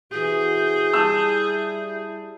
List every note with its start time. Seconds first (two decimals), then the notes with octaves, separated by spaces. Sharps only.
0.12 C3 E3 F#4 G#4 G6
0.93 G3 E4 A5 E6